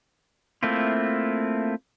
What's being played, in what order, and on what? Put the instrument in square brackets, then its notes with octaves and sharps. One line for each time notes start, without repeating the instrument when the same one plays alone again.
[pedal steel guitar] A3 A#3 C4 E4 F4